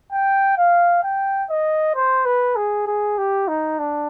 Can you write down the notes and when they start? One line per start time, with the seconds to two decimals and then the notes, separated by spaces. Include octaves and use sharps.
0.12 G5
0.58 F5
1.03 G5
1.50 D#5
1.95 C5
2.26 B4
2.56 G#4
2.87 G#4
3.18 G4
3.48 D#4
3.79 D4